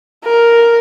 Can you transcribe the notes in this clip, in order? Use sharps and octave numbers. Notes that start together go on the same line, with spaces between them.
A#4